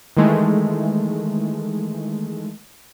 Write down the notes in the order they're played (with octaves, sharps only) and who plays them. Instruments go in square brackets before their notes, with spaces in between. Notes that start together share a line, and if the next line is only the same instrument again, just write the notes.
[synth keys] D#3 E3 G#3 A3